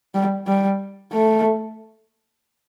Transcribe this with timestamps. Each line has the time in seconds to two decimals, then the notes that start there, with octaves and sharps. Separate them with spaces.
0.14 G3
0.47 G3
1.12 A3